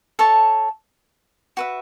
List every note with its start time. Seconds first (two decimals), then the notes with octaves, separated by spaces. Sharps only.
0.19 A4 C#5 A5
1.57 F#4 B4 E5